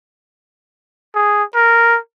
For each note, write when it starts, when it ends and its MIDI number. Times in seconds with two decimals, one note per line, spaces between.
1.15 1.43 68
1.55 1.97 70